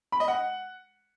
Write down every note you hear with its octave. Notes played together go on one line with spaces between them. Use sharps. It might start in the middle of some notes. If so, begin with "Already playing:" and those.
B5
D#5
F#5